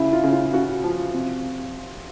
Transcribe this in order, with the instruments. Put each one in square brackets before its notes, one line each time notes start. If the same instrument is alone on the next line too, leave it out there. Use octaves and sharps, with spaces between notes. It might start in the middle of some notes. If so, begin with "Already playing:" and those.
Already playing: [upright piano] C#3 E4
F4
C#3
F4
C#3 F#4
F3
C3